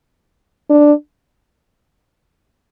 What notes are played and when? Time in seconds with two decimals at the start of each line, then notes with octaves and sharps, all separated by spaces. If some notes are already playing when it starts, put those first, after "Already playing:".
0.70 D4